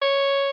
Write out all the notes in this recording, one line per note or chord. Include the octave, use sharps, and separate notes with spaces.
C#5